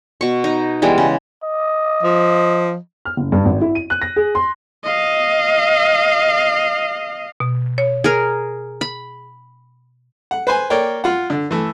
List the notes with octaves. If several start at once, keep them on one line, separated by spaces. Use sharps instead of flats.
B2 C#6
D#4
E3 G3 G#3 B3
C#3
D#5
F3
F6
F#1
G2
G#1
E4
D#7
F#6
A#6
G#4
C6
D#5 F5
B2
C#5
G#4 A#4
B5
F#5
B4 C5 G#5
A#3 A#4 C#5 D5 G5
F4 F#5
D3
E3 A3